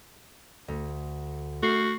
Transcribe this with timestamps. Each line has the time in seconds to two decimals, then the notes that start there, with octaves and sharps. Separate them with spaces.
0.68 D2
1.63 A3 F#4 C7